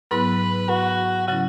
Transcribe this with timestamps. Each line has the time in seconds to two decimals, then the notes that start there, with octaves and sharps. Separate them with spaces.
0.11 G#2 F#3 B3 E4 B4
0.69 F#4
1.28 C#3 F#3 C#4 E4 F#4